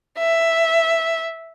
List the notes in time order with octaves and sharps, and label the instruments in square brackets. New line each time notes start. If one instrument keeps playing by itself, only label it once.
[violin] E5